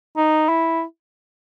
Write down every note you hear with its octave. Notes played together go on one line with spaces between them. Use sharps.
D#4
E4